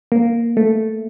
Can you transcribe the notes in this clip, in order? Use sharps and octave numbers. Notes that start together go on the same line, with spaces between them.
A#3
A3